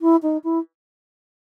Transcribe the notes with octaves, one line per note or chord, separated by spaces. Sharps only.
E4
D#4
E4